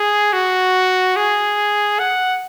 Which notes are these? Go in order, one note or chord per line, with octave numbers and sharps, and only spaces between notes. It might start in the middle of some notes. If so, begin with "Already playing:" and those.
Already playing: G#4
F#4
G#4
F#5